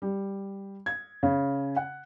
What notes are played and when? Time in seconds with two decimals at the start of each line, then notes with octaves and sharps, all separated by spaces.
0.02 G3
0.86 G#6
1.23 C#3
1.76 F#5